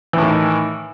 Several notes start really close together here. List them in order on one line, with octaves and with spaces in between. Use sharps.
E3 A2 D#3